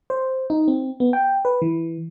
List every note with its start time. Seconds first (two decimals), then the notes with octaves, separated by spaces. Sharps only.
0.10 C5
0.50 D#4
0.68 C4
1.00 B3
1.13 G5
1.45 B4
1.62 E3